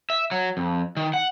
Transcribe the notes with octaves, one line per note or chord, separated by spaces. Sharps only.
E5
F#3
F2
D#3
F#5